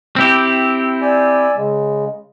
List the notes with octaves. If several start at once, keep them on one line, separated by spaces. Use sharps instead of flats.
C4 E4 G4
D5 G#5 E6
C#3 G#3